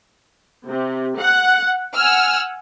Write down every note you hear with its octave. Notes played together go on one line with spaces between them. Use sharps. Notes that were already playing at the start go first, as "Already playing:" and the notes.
C3
F#5
F#5 G#5 E6 F6